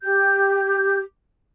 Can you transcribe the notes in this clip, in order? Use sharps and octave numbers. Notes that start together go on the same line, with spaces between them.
G4 G6